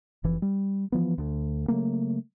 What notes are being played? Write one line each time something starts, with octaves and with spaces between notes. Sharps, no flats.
F1 E3
G3
E3 F3 B3
D2
C#3 F#3 A3 A#3